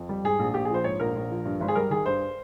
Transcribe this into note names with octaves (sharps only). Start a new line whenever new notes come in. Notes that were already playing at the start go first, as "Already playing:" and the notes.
Already playing: F2
G3
G#2 G#4
A#1
A#1 G4
G#4
F3 C5
G#2 C#5
A#1 A#4
A#1
F3
G2
G#1
G#4
G3 A#4
D#3 G#4
G2 C5